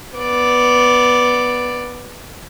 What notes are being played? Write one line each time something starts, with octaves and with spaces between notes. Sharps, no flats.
B3 D5